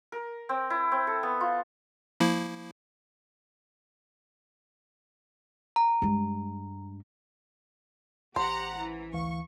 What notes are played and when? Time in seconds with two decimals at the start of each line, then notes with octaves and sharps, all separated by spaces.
0.12 A#4
0.49 C4
0.70 E4
0.92 C4
1.07 A4
1.23 B3
1.41 F4
2.20 F3 A#3 E4
5.76 A#5
6.02 G2 G#3
8.36 A1 G4 C5 F#5 A#5
8.78 E3
9.13 D2 E3 F5 C#6